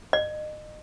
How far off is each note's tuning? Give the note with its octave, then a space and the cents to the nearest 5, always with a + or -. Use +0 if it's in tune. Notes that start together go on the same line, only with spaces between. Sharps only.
D#5 -30